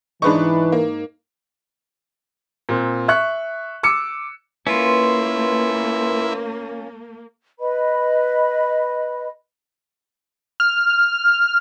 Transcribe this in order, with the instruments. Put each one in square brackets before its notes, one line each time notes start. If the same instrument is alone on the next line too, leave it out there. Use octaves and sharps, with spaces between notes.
[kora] G#2 D#4 [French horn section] E3 [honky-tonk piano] D4 B4 C#6
[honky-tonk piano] A#3
[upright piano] A#2 C4
E5 C#6 F#6
D6 E6 C#7
[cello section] A#3 [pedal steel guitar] C#4 F4 [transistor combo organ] E4 [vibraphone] B4 C6
[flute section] B4 D#5 B5
[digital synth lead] F6